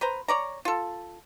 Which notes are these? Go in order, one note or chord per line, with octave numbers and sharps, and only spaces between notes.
B4 C5 A#5
C#5 D5 A#5
F4 A4